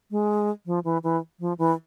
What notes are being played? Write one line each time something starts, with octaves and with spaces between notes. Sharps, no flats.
G#3
F3
E3
E3
F3
E3